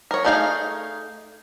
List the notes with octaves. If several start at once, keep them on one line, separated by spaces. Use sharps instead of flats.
A#4 C#5
A3 D4 D#4 G#4 F5